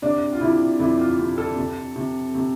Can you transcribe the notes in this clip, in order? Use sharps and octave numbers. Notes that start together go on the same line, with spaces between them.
C3 D4
F4
C3 E4
F2 E4
F4
C3
A4
C3
C3
C3